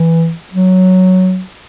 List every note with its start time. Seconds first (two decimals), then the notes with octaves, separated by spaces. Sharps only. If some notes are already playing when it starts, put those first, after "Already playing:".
Already playing: E3
0.53 F#3